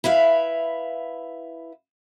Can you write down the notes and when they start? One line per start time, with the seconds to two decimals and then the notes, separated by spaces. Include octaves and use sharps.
0.04 E4 B4 E5 F5